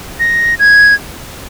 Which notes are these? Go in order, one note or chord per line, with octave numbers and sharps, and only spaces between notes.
A#6
G#6